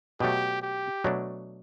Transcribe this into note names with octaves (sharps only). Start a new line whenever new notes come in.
B2 F#3 A3 G4
G4
B2 F#3 A3 D4